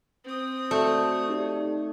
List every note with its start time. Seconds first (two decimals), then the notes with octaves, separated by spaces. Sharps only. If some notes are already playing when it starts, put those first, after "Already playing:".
0.24 C4 D#6
0.71 A3 F#4 D5
1.29 D#4 G4 D5